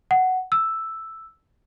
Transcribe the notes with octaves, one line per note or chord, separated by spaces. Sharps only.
F#5
E6